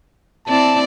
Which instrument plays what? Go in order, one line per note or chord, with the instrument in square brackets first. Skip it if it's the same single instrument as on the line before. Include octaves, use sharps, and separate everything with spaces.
[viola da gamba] C4 E4 D5 [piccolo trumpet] A5